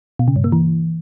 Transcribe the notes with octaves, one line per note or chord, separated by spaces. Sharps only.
B2
C#3
G2
A#3
E3